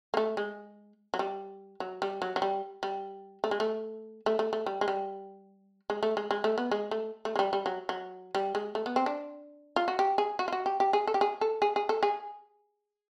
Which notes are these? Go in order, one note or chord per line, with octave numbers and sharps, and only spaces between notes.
A#3
A3
G#3
F#3
G3
F#3
G3
F#3
F#3
G3
G3
A3
G#3
A3
A3
A3
A3
G3
G#3
G3
G#3
A3
G#3
G#3
A3
B3
G#3
A3
A3
G#3
G3
G3
F#3
F#3
G3
G#3
A3
B3
C4
D4
F4
F#4
G4
G#4
F#4
F4
F#4
G4
G4
G#4
A4
G4
G#4
A4
G#4
G#4
A4
G#4